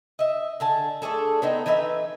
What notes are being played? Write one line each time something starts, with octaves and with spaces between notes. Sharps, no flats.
D#5 E5
D3 G#4 A5
A3 D4 G#4 A4
B3 C4 D#4
E3 D#4 B4 E5